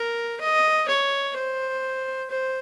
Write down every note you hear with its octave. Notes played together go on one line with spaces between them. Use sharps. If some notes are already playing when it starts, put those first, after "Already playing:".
Already playing: A#4
D#5
C#5
C5
C5